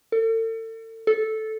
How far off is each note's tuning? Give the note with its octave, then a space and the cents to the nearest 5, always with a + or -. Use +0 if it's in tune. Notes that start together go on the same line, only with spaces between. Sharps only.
A4 +40
A4 -10